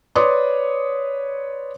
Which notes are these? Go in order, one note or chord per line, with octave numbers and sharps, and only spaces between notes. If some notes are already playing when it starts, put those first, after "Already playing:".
B4 C#5 D5 C6 D6 D#6